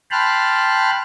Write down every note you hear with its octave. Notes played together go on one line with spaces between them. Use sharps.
G5 A5 B5 C6 F6 F#6